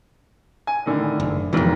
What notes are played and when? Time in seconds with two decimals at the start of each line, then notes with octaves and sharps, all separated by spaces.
0.67 G#5
0.86 A2 D3 D#3
1.20 F#1
1.53 B1 F2 G#2 D#3 E3